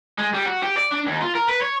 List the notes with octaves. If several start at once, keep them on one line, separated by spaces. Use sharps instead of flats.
G#3
G3
F#4
G4
D5
D4
D#2
F4
A#4
B4
C#5